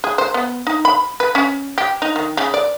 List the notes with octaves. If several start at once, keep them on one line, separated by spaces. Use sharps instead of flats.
G#4
C5
B3
D#4
B5
B4
C#4
G4
D#4
D#3
C#3
D5